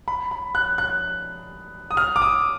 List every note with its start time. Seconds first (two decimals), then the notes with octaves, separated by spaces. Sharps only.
0.08 B5
0.31 B5
0.55 F#6
0.78 F#6
1.91 D#6
1.97 F6
2.16 D6
2.22 D#6